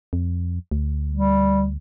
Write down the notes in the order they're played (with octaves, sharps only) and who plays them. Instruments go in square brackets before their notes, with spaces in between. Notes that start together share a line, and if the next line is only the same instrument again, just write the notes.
[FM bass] F2
D2
[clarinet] G3